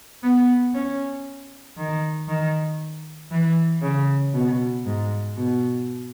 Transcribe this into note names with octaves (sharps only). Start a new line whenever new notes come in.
B3
C#4
D#3
D#3
E3
C#3
B2
G#2
B2